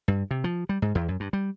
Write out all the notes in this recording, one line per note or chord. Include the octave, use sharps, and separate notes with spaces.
G2
C3
F3
G3
G#2
E2
F#2
G2
G3